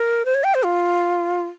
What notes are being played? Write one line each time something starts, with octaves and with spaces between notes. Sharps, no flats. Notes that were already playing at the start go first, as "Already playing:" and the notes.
Already playing: A#4
C5
C#5
G5
C5
F4